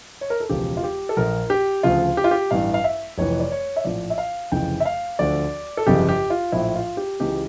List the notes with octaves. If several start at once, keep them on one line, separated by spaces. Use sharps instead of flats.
C#5
A#4
A4
E1 E2 C#3 F3 G4
F4
G4
A4
A#1 A#2 F3 A#4
G4
D2 C#3 F3 F4
G4
F4
G4
A1 G2 E3 F5
F5
E5
F1 F2 E3 C#5
D5
C#5
E5
A#1 A2 F3 D5
E5
F5
F1 F2 C#3 E3 G5
E5
F5
D2 D3 F3 D5
A4
G1 F2 C#3 F3 G4
G4
F4
A#1 A2 F3 E4
F4
G4
C#2 C#3 E3 G4